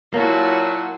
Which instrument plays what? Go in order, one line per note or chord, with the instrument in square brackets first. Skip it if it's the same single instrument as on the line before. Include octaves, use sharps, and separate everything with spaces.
[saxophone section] A#2 F#3 [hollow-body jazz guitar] A#3 [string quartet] E4 F#4 A5